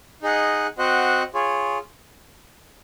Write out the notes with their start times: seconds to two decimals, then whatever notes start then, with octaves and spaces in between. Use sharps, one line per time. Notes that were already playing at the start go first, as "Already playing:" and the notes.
0.22 D#4 G#4 D#5 F#5
0.78 C4 F#4 C5 D#5 F#5
1.34 F4 G#4 C#5